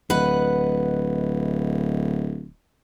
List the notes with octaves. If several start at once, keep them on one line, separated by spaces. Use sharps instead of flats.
D1 B4 D#5 F#5